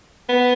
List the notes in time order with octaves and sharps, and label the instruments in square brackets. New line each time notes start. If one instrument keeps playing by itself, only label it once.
[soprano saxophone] B3